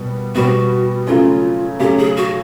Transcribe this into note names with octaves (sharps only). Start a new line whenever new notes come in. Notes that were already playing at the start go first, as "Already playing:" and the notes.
Already playing: B2 G3 B3
B2 G3 B3 F#4
C#3 F#3 A3 C#4 F4
C#3 F#3 A3 C#4 G4
G#4
F#4